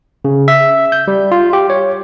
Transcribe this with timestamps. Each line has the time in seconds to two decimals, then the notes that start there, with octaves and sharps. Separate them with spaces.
0.25 C#3
0.48 E5
0.92 G6
1.08 G3
1.32 F4
1.53 G4
1.70 C#5